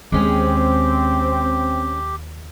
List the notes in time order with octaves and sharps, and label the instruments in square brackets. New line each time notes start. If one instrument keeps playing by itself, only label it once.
[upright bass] D#2 [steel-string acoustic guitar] G#3 C#4 G#4 [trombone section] C4 [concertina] G4